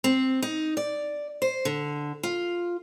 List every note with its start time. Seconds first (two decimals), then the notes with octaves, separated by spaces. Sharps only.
0.04 C4
0.42 D#4
0.77 D5
1.42 C5
1.65 D3
2.23 F4